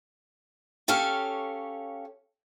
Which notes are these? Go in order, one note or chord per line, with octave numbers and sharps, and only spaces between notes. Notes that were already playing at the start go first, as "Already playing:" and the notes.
C#4 G4 A4 C#5 F5